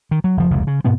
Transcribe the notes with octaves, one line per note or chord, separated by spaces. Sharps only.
D#3
F#3
F#1 F3
F1 C#2 A#2
C#3
G#2 B2 B3 C4